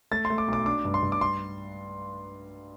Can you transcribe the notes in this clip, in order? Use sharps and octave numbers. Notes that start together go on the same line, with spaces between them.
A3 A6
C6
A3
D6
B1
D6
D4 D6
G2
C6
G2
D6
C6